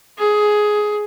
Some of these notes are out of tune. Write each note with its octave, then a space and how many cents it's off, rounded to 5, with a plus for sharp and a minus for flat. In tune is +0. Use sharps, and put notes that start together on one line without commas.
G#4 +10